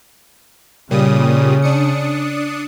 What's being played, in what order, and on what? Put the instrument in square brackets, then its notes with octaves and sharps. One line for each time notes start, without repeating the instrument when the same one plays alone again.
[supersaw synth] A#2 G3 D#6 [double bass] C#3
[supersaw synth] D4 D#6 C#7